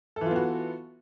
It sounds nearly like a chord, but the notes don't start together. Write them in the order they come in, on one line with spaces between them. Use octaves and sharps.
A4 E3 F4 B3 F#4